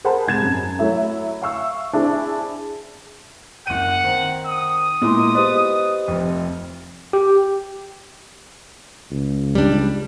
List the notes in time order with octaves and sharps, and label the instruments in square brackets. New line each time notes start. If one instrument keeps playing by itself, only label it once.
[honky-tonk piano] G#4 A#4 C5 F#5 A5 B5
G#2 C3 G#6 A6 E7
F#2
F#3 A3 E4 E5
E5 F5 C#6 E6
D4 E4 G#4 C5
[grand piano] F#1 D#7 [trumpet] F#5
[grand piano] D#3 C4
[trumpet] D#6
[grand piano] A#2 G#3 [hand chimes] B3 E4 C6
[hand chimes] G4 C5 D#5 [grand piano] B4
[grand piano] F1 F2
[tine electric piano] G4
[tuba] C#2
[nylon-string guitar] G3 D4